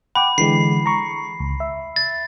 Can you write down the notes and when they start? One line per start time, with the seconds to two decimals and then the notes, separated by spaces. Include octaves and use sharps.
0.15 F#5 G5 B5 D6
0.38 D3 E3 G#3 C7
0.86 A#5 C#6
1.40 C#2
1.60 E5
1.96 A6